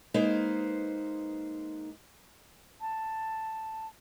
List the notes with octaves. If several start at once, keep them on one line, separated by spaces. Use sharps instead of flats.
G#3 A#3 D#4 B4 C5
A5